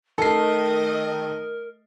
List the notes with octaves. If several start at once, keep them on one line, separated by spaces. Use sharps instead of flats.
D#3 A3 A4 A#4 D#5 C7